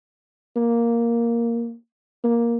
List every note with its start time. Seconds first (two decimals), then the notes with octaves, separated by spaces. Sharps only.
0.56 A#3
2.24 A#3